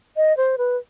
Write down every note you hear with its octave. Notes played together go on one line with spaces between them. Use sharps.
D#5
C5
B4